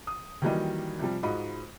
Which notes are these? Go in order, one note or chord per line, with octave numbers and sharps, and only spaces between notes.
D#6
D#3 E3 F#3 G3 A#3 D#5
C3 F3 G3
G#2 F4 F#4 D#5 B5